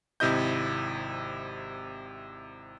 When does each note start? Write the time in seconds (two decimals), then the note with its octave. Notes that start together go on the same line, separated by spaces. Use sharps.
0.20 G#1 C3 E4 D#5 G6